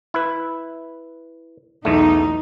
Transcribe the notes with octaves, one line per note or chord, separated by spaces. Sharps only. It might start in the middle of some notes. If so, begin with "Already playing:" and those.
E4 B4
B1 E2 A3 D#4